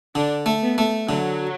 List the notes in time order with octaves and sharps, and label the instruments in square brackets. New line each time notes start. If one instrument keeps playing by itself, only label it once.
[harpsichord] D3 [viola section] D4
[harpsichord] A3
[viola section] B3
[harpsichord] A3
[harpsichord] D3 [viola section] F#3